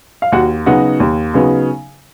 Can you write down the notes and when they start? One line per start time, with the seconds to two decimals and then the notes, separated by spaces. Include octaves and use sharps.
0.22 F5
0.32 D#2 F#4 F#5
0.66 C#3 F#3 B3 D#4 F#4 F#5
1.00 D#2
1.34 C#3 F#3 B3 D#4